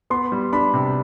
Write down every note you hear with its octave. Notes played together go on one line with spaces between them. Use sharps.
B3 C6
G3
D4 B5
C3